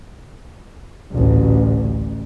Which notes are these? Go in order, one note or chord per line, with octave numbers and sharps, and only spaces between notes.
A1 D2